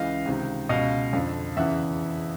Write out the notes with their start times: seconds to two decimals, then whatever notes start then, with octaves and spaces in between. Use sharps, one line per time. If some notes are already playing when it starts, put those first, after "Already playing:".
Already playing: C#2 C#3 E3 D#5 F5
0.25 C#2 C3 D#3
0.69 C#2 B2 D#5 F5
1.13 F2 D3
1.57 E2 C#3 E3 E5 F#5